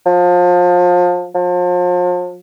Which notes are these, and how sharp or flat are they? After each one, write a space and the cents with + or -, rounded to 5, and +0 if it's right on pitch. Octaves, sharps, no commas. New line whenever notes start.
F3 +30
F3 +40